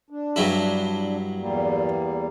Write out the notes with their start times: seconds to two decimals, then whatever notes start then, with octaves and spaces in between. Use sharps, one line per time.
0.10 D4
0.36 G2 F#3 E4
1.39 E2 G3 A#3